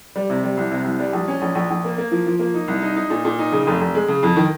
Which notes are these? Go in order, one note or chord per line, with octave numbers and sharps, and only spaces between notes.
G3
C3
G3
C2
C3
C2
G3
A#1
C#4
A#1
A#1
A#1
A#3
A#3
F3
F3
A#3
D#4
C2
D#4
D#4
A#2
A#2
D#4
C#3
F1
F1
G#3
C#3
F2
D#3